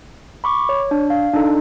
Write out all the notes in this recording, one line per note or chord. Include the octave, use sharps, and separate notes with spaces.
B5 C#6 D6
C#5
D4
F5
D4 D#4 A4